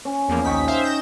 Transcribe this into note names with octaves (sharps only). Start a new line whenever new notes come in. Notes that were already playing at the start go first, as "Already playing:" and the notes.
C#4
E2 F3 A#3
A#1 D#2 D#4 G5 C#6 B6
C5 E5 F5
G6 A#6 E7